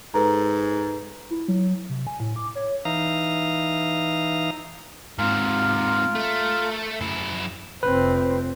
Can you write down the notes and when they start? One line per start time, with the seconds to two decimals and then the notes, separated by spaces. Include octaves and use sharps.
0.14 G#2 A4 B4 A#5
1.30 E4
1.48 F#3
1.90 C3
2.07 G#5
2.20 A2
2.36 D6
2.55 C#5
2.85 E3 D#4 F5 A#5
5.18 G#2 C3 F4 A#4
6.16 A3
7.01 F#2 E4
7.83 F1 C4 B4